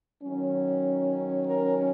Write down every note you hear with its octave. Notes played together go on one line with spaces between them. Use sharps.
D#3 F#3 C#4
A#4